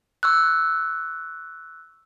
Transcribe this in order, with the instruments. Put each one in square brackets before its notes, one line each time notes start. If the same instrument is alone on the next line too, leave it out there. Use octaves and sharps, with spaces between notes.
[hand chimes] C#6 E6 F#6